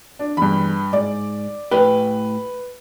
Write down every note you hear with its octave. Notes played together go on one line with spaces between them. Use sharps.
D4
E2 G2 B5
G#2 D5
A2 G4 B4